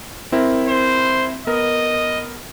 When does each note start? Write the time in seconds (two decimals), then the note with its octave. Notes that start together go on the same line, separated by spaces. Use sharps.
0.32 C4 E4 A#4
0.69 C5
1.47 B3 A#4 D#5